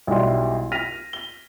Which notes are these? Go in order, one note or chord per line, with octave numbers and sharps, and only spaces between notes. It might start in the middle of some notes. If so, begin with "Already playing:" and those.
B1 G3 E4 D5 C6
F6 A#6 B6 D#7 F7
G7